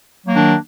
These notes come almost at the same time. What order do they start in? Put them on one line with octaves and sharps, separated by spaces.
F#3 A#3 D#3 D4